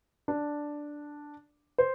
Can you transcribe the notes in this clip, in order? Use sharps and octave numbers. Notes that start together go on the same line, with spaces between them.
D4
C5